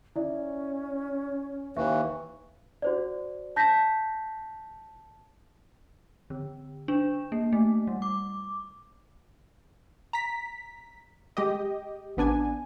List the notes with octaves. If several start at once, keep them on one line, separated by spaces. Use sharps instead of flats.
C#4 E4 D5 E5
D#2 E3 E5 C#6
F#4 C5 D5
A5 G6 A#6 B6
D3
D4
A#3
A3
G3
D6
A#5 B6
G#3 G4 D#5
A1 B3 D4 G#5